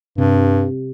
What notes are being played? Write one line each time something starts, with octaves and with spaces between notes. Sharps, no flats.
G2 C3